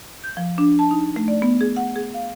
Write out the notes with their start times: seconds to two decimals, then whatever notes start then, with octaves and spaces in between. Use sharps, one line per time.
0.24 G6
0.37 F3
0.58 D4
0.79 A5
0.91 D#4
1.16 A3
1.28 D5
1.42 B3
1.61 G#4
1.76 F#5
1.96 G#4
2.14 F5